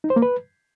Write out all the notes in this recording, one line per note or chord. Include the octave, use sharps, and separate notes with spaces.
D#4
C5
A#3
B4